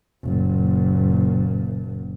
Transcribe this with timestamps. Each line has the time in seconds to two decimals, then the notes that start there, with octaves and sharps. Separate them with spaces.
0.23 F#1 A#2